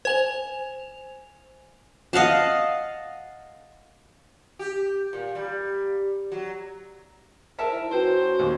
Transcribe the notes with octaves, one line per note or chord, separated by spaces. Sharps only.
C5 G#5 F7
D#5 F5 F#5 A5
G4
A#2
G3
F#3
A#4 C5 E5 A5
E4
F#2 F#4 B4 C5 G5
D#2